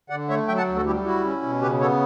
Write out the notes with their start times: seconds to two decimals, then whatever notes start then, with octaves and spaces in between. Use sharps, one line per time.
0.10 D3 D5 F#5
0.29 A3 C#5 E5
0.48 F#3 E5 G5
0.57 F#5 A5
0.67 D2
0.76 F#4 A4
0.86 G3 E4 G4
1.04 E4 F#4
1.24 C#4
1.42 B2
1.62 C#3 G4 B4
1.81 B3 A4 C#5